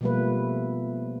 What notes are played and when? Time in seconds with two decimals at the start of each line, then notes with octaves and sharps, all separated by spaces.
0.01 B2 F3 G3 A3 A#3 B4